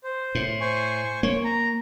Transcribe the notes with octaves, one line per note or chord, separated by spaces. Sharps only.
C5
A2
C5 G#5 C#6
A#3 C#5
A#5